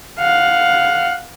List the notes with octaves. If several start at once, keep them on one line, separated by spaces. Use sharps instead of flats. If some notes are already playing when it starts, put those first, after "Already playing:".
F5 F#5